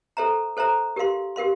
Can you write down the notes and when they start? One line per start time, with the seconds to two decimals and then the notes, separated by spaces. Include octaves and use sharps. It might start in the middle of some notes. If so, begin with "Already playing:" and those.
0.17 A4 C5 E5 A#5
0.57 A4 C5 E5 A#5
0.96 G4 A#4 F5 C6
1.36 G4 A#4 F5 C6